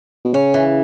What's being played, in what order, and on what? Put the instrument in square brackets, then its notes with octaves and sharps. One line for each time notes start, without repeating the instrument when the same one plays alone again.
[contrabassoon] B2
[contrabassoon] C#3 [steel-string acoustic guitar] C#4
[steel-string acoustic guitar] E3